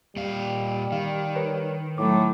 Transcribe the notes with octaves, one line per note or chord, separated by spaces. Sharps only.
A#2 G3 D#5 F5
D#3 F5
A#4 B4 C#5
A2 F#3 A3 D6